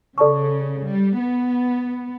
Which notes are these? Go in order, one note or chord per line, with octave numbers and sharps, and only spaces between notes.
C#3 A4 D5 A5 C#6
G3
B3